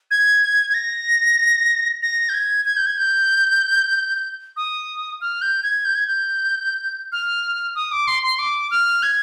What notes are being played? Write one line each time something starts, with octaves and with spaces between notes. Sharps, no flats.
G#6
G#6
A#6
A#6
G6
G#6
G#6
G6
G#6
G6
D#6
F6
G6
G#6
G6
G#6
G6
F6
D#6
D6
C6
C6
D6
F6
G#6